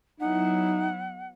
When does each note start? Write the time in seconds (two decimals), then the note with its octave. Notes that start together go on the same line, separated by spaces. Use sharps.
0.20 F#3 B3 D#4 E4 F#5